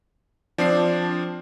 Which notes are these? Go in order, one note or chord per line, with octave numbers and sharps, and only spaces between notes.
F3 C4 D4 C7